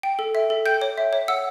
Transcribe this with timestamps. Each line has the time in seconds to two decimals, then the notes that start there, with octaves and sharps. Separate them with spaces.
0.03 G5
0.19 A4
0.35 E5
0.50 A4
0.66 G5 G6
0.82 C#5
0.98 E5
1.13 C#5
1.28 F#5 E6